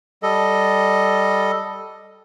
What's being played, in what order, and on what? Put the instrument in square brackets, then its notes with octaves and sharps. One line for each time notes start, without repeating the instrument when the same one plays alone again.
[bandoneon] G3 A4 D#5